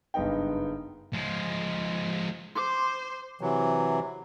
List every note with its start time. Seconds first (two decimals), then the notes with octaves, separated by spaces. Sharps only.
0.14 F#1 G2 B3 D#4 G5
1.14 F3 G#3
2.55 C5 C6 D6
3.41 C3 E3 F#3